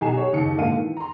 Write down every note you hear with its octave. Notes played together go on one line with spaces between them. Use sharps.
B1 G4 G#5 A#5 C7 E7
G4 C#5
F#1 D#2 C#3 C#7
G#1 A#2 D3 A4 F5 D#7
D#3 E3
A#5 C6